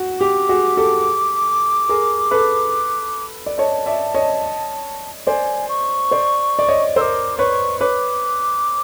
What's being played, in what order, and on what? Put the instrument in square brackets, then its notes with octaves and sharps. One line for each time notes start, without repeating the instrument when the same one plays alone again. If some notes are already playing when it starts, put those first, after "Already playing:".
Already playing: [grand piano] F#4
[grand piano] G4 [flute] D6
[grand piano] F#4 G#4
G4 A4
G#4 A#4
A4 B4
D5
[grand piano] C#5 D#5 [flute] A5
[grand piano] D5 E5
C#5 D#5
[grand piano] C5 D5 [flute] G#5
[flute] C#6
[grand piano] C5 D5
D5
C#5 D#5
[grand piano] A#4 C5 [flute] E6
[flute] D6
[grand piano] B4 C#5 [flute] C#6
[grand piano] B4 C#5 [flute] D6